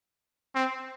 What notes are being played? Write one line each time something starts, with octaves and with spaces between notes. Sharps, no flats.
C4